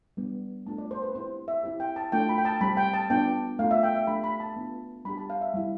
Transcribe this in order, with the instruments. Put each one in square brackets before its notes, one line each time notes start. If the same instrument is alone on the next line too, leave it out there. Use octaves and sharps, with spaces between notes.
[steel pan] G3 B3 D4
A3 D4 F4 A5
D5
C5
B4
C4 E4 G4 C5
E5
C4 E4 G4
G5
A5
A3 D4 F4 G5
B5
G5
A5
G3 C4 G4 B5
G5
A5
B3 D4 F4 G5
A3 D4 F4 F5
E5
G5
E5
A3 D4 G4 B5
B5
A5
B3 D4 F4
G3 D4 G4 B5
A5
F5
E5
G3 C4 E4 G4